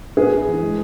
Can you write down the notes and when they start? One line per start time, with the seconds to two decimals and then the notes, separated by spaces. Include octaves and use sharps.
0.17 B3 G#4 B4
0.32 B3
0.47 E3
0.62 G#3